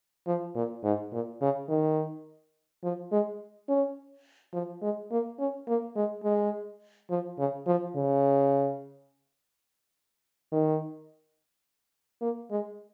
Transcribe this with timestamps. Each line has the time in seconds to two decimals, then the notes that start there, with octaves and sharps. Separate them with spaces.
0.27 F3
0.55 A#2
0.84 G#2
1.13 A#2
1.41 C#3
1.69 D#3
2.83 F3
3.12 G#3
3.69 C#4
4.53 F3
4.82 G#3
5.11 A#3
5.39 C#4
5.68 A#3
5.96 G#3
6.24 G#3
7.10 F3
7.39 C#3
7.67 F3
7.96 C#3
10.52 D#3
12.22 A#3
12.51 G#3